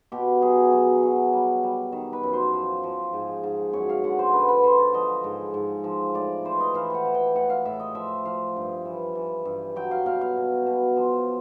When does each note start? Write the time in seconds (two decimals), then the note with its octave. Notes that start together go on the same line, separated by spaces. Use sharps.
0.12 B2 G4
0.42 F#3 G#4
0.72 F#3
1.03 F#3
1.33 G3
1.64 G3
1.92 D#3
2.13 B4
2.23 F#2
2.33 C5
2.54 F3
2.84 F3
3.13 G#2
3.43 G#2
3.73 F#2 C#5
3.89 F5
4.04 D3 F#5
4.19 C5
4.33 D3 B4
4.49 B4
4.63 D3 C5
4.79 D5
4.94 F3 D#5
5.24 G#2
5.54 G#2
5.84 F3
6.14 A2 D5
6.44 E3 C5
6.60 D#5
6.74 E3 F5
6.90 F#5 G5
7.05 E3
7.14 G5
7.35 A2 F#5
7.50 F5
7.65 A2 E5
7.80 D#5
7.95 F3 E5
8.25 F3 F5
8.56 G2
8.85 E3
9.15 E3
9.45 G2
9.76 F#3 G5
9.91 F5
10.06 B2 F5
10.21 F5
10.37 B2
10.67 B2
10.96 F3